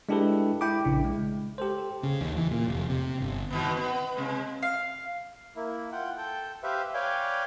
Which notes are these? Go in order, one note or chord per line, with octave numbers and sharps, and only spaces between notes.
G#3 D4 E4 G4 A4 B4
E4 G5 B5 D6
A#1 C#3 D4 E4
G#3
G4 A4 C5
C#3
D#2
E3
A#2
F1
C3
G1
B2 D#3 B3
B3
C3 G#3
F5
A#3 E4
F4 F#5 G5
A4 G5
G4 B4 C5 E5 F5
B4 C#5 D5 F5 G5 G#5